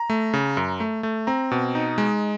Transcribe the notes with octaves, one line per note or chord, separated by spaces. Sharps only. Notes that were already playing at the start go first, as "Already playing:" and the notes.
Already playing: A#5
A3
C#3
F#2
A3
A3
C4 A#5
B2
D#4
G#3